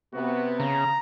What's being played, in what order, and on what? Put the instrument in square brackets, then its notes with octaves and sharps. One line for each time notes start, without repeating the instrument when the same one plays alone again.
[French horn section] C3 B3 [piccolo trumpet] F#4
[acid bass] C#3 [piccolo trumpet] A#5